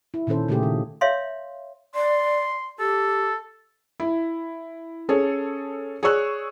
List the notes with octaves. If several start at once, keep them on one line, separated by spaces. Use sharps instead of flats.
E4
A#2 D#3 C#4 A4 C5
A#2 C#3 A3 A#3 G4 G#4
D#3
C#5 E5 F5 C6
D5 C6
G4 A4
E4
C#4 G#4 A4 C#5
G#4 C#5 D5 C#6 E6 F#6